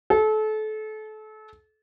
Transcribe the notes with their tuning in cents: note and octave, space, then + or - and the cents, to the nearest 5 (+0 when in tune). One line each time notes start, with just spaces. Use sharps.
A4 -30